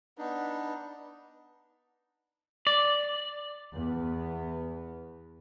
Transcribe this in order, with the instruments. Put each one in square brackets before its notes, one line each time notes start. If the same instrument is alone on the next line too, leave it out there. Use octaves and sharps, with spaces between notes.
[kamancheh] B3 [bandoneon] D4 D#4
[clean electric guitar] D5
[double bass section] E2 B3